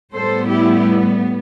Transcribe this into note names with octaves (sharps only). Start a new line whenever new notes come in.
A2 G3 B3 A4 C5
E4 G4